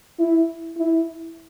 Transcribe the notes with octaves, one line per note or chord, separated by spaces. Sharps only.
E4
E4